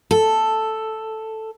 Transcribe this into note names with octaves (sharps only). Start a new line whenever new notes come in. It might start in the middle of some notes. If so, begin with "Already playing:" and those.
A4